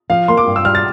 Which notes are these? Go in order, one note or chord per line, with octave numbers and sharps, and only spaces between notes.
F3 F5
A#3 C6
D6
G2
E6
G3 F6
A6